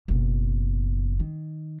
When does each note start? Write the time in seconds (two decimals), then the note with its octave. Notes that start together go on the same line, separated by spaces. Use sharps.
0.08 F#1 B2
1.20 D#3